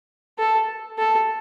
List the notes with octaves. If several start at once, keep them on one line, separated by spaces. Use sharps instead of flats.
A4
A4